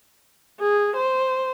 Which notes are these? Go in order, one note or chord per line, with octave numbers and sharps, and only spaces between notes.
G#4
C5